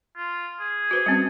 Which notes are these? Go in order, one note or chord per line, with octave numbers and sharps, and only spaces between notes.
F4
G#4
F#4 B4 C5
G3 C4 C#4